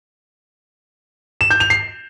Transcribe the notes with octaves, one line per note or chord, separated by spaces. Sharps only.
E7
G6
F7
C7